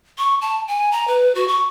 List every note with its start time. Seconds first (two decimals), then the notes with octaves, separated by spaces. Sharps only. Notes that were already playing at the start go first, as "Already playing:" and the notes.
0.18 C#6
0.41 A5
0.68 G#5
0.92 A#5
1.07 B4
1.35 F#4
1.48 C#6